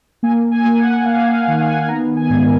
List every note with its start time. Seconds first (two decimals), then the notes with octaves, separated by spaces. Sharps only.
0.23 A#3 G#5
0.51 G#5
0.65 A#3
0.78 F#5
1.05 A#3 F5
1.33 F5
1.48 D#3
1.61 G#5
1.82 G#5
1.88 B3 A#5
2.16 G#5
2.30 G#2
2.44 A#4